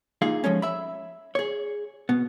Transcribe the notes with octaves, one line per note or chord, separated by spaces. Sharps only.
A#3 D#4 F4 G#4 F5
F3 G#3 A3 C#4
E5 B5
G#4 C#5
B2 B3